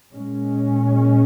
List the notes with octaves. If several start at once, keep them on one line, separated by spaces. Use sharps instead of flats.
A#2 G#3 C#4